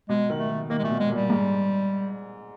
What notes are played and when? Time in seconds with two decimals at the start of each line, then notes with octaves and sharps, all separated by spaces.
0.09 B2 G#3
0.30 D#3
0.39 A3
0.50 D#3
0.70 D#3 A#3
0.79 G#3
0.82 A#2 A3
0.90 B2
1.00 G#3
1.10 A#2
1.15 G3
1.30 G#2